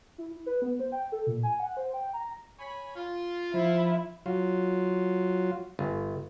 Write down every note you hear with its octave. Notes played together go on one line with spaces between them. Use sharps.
E4
B4
B3
C5
G5
A4
A#2
G#5
F#5
C5
G5
A#5
C#5 G#5 B5
F4
F3 E4
F#3 F4
G1